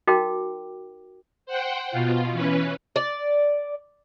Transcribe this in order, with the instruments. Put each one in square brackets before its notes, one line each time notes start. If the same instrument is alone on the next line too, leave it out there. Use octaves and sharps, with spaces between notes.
[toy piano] D#4 F#4 A#4 G5 D6
[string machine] C5 F#5 G5
B2 F4
E3 C#4 B4
[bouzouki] D5